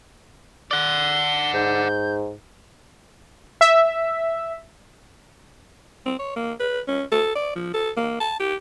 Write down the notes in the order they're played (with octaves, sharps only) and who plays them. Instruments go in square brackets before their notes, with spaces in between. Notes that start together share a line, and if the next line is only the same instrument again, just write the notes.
[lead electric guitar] D5 F#5 [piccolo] G7
[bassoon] G#2 [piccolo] G6
[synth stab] E5
[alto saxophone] C4
C#5
A#3
B4
C#4
A4
D5
F3
A4
A#3
A5
G4